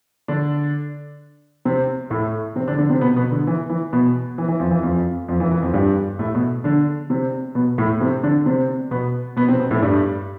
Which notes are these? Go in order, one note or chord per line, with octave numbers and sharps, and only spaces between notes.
D3 D4
C3 C4
A2 A3
C3 C4
D3 D4
D3 D4
C3 C4
B2 B3
B2 B3
D3
E3
E3
B2 B3
E3
E3
F2 F3
E3
F2 F3
F2 F3
E3
E3
F2 F3
G2 G3
A2 A3
B2 B3
D3 D4
C3 C4
B2 B3
A2 A3
C3 C4
D3 D4
C3 C4
B2 B3
B2 B3
C3 C4
B2 B3
A2 A3
G2 G3